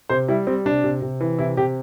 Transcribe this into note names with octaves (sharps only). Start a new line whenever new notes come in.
C3 C5
G3 E4
G3 C4
C3 D4
C3
C3
E3
C3 E4
C3 G4